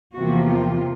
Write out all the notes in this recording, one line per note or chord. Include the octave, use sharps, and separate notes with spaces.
E2 C3 F3 A#3 F#4
F4